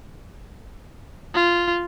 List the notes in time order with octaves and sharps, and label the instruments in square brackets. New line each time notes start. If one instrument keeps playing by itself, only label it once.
[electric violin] F4